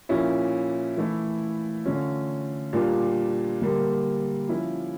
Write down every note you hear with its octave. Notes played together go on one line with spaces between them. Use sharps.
A#2 F3 C#4 E4
E3 A3 E4
D3 A3 C#4 F4
A#2 G3 D4 F4
D3 G3 A#3
F3 C#4 E4